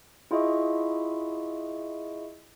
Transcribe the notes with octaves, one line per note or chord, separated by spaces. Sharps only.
E4 F4 G#4 D#5 E5 C#6